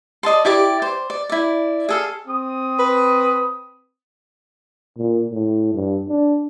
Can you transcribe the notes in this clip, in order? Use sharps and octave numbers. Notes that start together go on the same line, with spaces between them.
D5 D#5 A5 C6
E4 G4 D5 D6
C5
D5
E4 D5
G#4 A4 F5
C4 D#6
B4
A#2
A2
G2
D4